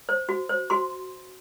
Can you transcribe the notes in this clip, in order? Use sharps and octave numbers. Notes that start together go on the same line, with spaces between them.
C5
F#4
C5
F#4 C6